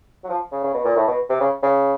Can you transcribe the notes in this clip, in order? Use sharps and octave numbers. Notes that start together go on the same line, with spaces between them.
F#3
F3
C#3
C#3
B2
A#2
A2
B2
C3
C#3
C#3